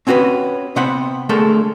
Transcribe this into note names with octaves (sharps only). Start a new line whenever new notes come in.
C4 C#4 F#4 A#4 B4
C3 B3 C4 F#5 B5
D2 G#3 A3 A4 A#4